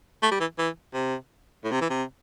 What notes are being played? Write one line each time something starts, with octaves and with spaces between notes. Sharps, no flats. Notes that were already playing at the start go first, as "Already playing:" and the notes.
A3
G3
E3
E3
C3
A2
C3
E3
C3